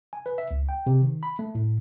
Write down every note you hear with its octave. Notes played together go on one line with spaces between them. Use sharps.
G#5
B4
E5
C#2
G5
C3
D#3
B5
A3
A2